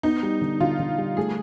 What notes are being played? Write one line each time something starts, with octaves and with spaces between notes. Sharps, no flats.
B3 D#4
G3
D3
D3 F4
D3
G3
A3 G#4